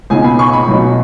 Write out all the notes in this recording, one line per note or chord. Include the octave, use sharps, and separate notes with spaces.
C#2 B2 B3 D#4 G#5
B5
C#6
B5
B1 B2 F#3 D#4